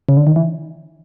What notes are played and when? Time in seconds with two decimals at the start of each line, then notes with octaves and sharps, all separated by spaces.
0.09 C#3
0.17 D3
0.27 D#3
0.36 E3